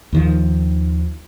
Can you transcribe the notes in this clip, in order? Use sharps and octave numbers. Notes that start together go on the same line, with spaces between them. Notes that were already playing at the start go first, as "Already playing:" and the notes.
D#2 D#3 F3